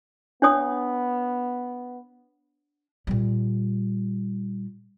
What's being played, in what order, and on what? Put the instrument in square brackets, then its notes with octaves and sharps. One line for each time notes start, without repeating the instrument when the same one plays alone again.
[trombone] B3 [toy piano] D4 C#5 D#6
[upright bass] A#2 G3